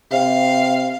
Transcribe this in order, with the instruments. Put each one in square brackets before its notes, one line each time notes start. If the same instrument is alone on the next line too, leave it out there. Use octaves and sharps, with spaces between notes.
[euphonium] C3 [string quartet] F5